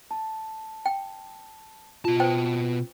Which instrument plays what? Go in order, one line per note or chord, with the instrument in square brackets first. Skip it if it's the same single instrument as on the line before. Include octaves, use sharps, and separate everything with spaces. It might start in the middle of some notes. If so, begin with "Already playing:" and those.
[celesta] A5
[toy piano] G5
[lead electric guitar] B2 A5 [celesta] F4
[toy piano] B4 C5 G5